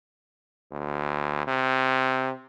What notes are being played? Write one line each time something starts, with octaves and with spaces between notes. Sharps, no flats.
D2
C3